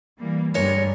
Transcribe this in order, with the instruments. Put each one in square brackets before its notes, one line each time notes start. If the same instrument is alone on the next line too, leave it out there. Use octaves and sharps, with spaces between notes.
[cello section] E3 G3 A#3
[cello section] G2 D3 G3 [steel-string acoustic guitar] G#3 A#4 C#5